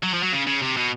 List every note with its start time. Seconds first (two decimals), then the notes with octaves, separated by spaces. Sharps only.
0.03 F#3
0.14 F3
0.23 F#3
0.33 C#3
0.47 C#3
0.62 C3
0.77 B2